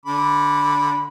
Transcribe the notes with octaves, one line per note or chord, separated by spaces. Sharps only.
D3 B5 D6